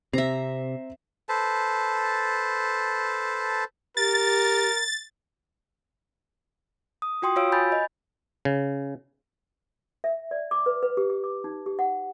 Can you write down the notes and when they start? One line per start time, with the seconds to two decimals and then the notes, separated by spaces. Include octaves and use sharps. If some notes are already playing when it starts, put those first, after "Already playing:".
0.13 C3 C4 E5 A#5 C7
1.29 A4 B4 C5 A5
3.97 G4 A#4 A6
7.02 D#6
7.22 F4 F#4 G5 C6 D#6
7.36 F4 F#4 C#5 F5 E6 D7
7.52 G#5 B5 G6 A6
7.72 D#5
8.45 C#3
10.04 E5
10.31 D5
10.51 D6
10.66 B4
10.83 B4
10.97 G4
11.10 G4
11.24 D6
11.44 D#4
11.66 G4
11.79 F#5